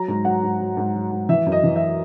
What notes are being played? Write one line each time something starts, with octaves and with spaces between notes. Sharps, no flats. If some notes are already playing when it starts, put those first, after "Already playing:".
Already playing: F#3 A#5
G#2
F#3 F#5
G#2
F#3
G#2
F#3
G#2
E3 E5
F#2
D#5
E3
E5